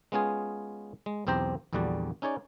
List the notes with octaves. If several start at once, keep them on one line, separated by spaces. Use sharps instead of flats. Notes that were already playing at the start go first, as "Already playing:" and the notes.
G#3 B3 C#4 F4 G#4
G#3
B1 E2 C4 G4 C5 A#5
A#1 E2 D3 G3 F#4 D5
C#4 D#4 G#4 C#5 D5